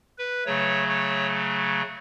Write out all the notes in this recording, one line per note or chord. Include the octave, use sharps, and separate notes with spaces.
B4
C#3 F#3 A3 C#5
C#5